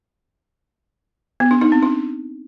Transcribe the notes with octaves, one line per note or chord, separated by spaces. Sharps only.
B3
D4
D#4
C4
D4